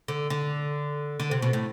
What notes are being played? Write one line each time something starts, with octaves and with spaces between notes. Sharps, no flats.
D3
D3
D3
C3
B2
A2